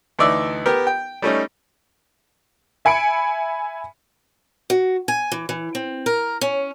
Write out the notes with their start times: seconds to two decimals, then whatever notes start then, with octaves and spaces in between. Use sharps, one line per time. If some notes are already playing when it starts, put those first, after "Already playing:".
0.19 D2 E3 D#4 D5 E5 E6
0.66 B3 G4 A#4
0.87 G5
1.22 G3 A3 C#4 D#4
2.85 E5 G#5 B5 C#7 D7
4.70 F#4
5.08 G#5
5.32 E3
5.49 E3
5.75 C4
6.06 A#4
6.41 C#4